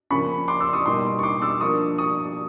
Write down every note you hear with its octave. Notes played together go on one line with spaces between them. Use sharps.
C#3 F3 A#3 C#4 B5 C#6
C6 D6
D6 E6
C#6 D#6
B2 G3 A#3 D#4 C6 D6
C#6
C6 D6
D6 E6
F3 A#3 D4 C#6 D#6
C#6 D#6